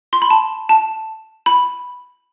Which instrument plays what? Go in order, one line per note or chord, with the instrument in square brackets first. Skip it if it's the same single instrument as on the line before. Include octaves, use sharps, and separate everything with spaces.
[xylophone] C6
B5
A5
A5
B5